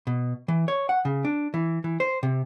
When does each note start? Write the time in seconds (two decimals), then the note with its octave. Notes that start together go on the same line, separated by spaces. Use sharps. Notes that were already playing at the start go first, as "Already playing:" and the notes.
0.07 B2
0.48 E3
0.68 C#5
0.89 F#5
1.05 C#3
1.25 D4
1.54 E3
1.84 E3
2.00 C5
2.23 C3